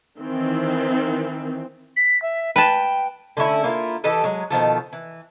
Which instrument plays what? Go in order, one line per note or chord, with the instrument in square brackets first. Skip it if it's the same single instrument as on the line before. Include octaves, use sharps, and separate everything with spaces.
[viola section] D#3 E3 C4
[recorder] B6
E5
[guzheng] B4 A5 [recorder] G5
[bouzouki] D3 A3 C#4 E4
A#3 E4 F4
E3 G4 A4 D#5
F#3 G#3
B2 D#3 F3 A3
E3